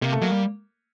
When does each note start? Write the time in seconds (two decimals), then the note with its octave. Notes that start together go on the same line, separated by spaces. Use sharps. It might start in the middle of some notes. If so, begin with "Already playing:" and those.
0.02 C3 A#3
0.12 A3
0.21 F#3 A#3
0.31 G3